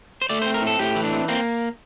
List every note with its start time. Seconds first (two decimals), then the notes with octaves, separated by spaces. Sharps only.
0.22 C5
0.29 A3 D5
0.42 C4 C5
0.54 A#4
0.62 A2 A4
0.79 A2 G4
0.96 E3
1.04 D4
1.12 C4
1.28 A#3 C4